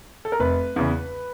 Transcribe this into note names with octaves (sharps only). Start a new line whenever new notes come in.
A4
A#4
F1 B4
E2 C#3